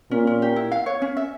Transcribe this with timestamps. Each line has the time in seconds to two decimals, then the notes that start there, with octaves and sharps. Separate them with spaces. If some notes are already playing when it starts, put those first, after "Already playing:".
0.11 A#2 C#4
0.27 C#4
0.42 G4
0.56 E4
0.72 F5
0.86 C#5
1.02 C#4
1.17 E5